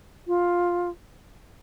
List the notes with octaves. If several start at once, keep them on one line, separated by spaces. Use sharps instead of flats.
F4